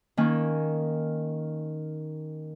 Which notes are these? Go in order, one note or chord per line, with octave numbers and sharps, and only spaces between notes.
D#3 A#3 C#4 G#5